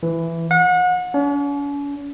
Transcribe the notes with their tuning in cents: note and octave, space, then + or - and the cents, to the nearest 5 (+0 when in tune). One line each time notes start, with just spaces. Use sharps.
E3 +10
F#5 -35
C#4 +45